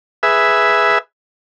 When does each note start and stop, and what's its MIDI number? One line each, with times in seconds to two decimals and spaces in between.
0.23 0.98 68
0.23 0.98 71
0.23 0.98 76